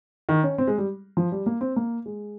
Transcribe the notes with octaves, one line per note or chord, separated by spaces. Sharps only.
D#3
C#4
C4
G#3
G3
F3
G3
A#3
C4
A#3
G#3